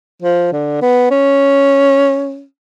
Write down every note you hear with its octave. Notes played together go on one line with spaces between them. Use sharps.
F3
D3
B3
C#4